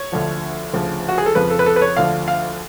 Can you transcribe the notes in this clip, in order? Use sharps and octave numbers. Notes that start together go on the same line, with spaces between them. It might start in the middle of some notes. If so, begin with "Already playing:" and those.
Already playing: C#5
D2 D3 F3
D2 C#3 F3
F#4
G#4
A4
F2 C#3 F3 B4
A4
B4
A4
B4
C#5
D2 D3 F3 F5
F5